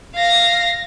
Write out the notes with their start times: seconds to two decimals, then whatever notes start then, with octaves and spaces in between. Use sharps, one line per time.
0.15 F5 A#6